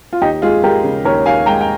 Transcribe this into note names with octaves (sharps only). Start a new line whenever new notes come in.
F4
D#2 D#4 G4
G#3 F4 G#4
G#3 G4 A#4
C#3
D#2 A#4 C#5
D#2 F5 G#5
G#3 G5 A#5
G5